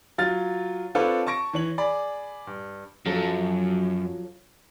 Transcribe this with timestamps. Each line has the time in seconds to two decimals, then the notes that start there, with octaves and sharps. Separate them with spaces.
0.18 F#3 F4 F6 A6
0.95 C4 D4 F4 A4 B4 C#5
1.27 A5 C#6 A#6 D7
1.53 E3 C#5 F#7
1.78 G#4 D5 B5
2.47 G2
3.06 F#2 F3 F#3 A4